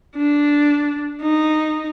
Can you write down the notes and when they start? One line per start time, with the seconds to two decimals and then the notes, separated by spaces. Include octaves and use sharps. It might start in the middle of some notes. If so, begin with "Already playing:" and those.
0.16 D4
1.21 D#4